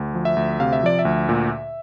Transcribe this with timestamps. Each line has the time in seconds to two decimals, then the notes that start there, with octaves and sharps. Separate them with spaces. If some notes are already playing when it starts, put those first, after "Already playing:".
Already playing: D2
0.14 F3
0.25 E5
0.37 D2
0.60 C3 F5
0.73 E5
0.83 F3 D5
0.99 E5
1.05 D2
1.29 A#2